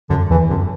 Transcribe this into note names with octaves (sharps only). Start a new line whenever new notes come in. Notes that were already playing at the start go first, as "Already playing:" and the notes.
F#2 D3
E2 E3
F#2 D3